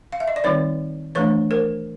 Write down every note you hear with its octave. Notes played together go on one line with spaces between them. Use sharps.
F5
E5
D#5
D5
D#3 G3 C4 D#4 B4 C#5
E3 A3 D4 B4 C#5
A#4 C5